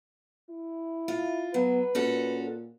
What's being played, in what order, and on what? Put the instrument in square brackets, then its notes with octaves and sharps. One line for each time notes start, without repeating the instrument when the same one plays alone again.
[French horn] E4
[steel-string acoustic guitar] F4
[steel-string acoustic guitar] F#3 [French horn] B3 [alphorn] B4
[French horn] A#2 [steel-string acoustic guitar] C#4 F#4 A4